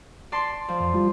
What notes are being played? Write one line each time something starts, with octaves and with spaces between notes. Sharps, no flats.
D5 A5 C6
F3
F2
G3 F4